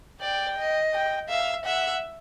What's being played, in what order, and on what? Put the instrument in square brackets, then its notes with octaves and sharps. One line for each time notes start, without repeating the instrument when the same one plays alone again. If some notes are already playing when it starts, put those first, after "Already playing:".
[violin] D5 [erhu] G5
[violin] D#5
[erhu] G5
[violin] E5 [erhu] F5
[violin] E5 [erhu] F#5